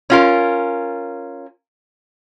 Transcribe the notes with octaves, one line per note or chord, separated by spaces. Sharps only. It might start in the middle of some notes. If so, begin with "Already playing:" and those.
C#4 F4 A#4